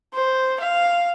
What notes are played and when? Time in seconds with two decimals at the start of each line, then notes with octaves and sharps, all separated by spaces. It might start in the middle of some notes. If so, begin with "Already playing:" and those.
0.14 C5
0.60 F5